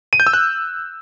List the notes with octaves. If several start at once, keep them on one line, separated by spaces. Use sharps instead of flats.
D#7
G6
E6
F#6